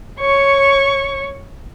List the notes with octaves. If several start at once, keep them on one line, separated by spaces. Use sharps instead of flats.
C#5 C#6